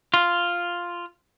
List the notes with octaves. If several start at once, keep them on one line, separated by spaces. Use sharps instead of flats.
F4